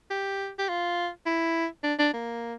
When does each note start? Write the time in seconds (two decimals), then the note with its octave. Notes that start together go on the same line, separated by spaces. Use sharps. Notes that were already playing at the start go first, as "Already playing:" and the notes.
0.10 G4
0.59 G4
0.69 F4
1.26 E4
1.84 D4
1.99 D4
2.14 A#3